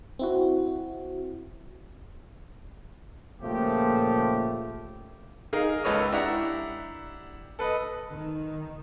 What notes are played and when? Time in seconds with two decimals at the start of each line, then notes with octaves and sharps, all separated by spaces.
0.19 C4 E4 F#4
3.42 A#2 C#3 F3 A3 G4
5.53 D#4 G#4 A#4 F5
5.83 C#2 A4 B4 C#5 D#5 E6
6.12 D4 E4 G4 E5 F#5 A#5
7.59 A4 B4 D#5
8.11 D#3